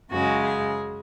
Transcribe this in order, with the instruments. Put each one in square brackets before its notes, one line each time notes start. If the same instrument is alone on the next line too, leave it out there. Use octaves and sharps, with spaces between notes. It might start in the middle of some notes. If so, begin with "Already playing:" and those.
[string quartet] F#2 C#3 G#3 F#4
G#4